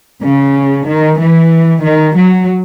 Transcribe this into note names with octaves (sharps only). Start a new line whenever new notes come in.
C#3
D#3
E3
D#3
F#3